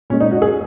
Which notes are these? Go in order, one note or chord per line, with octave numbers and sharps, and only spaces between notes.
A#2 G#3 C#4
D#4
F#4
G#4